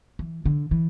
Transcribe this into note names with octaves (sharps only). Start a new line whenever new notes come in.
E3
D3
E3